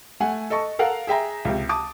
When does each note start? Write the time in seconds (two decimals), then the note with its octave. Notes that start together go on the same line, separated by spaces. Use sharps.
0.20 A3 F#5 G#5
0.50 A4 D#5 A5 C#6
0.79 A4 A#4 F5 F#5
1.07 G#4 E5 G5 A#5
1.45 C#2 C3
1.69 A5 D6 D#6